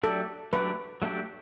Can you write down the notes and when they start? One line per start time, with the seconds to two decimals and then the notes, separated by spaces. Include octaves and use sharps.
0.03 F#3 A3 D4 G4 A4 D5
0.53 F#3 A3 D4 G4 B4 D5
1.02 F#3 A3 D4 G4 D5